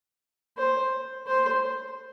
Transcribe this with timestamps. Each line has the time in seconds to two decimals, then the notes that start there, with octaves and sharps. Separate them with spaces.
0.58 C5
1.27 C5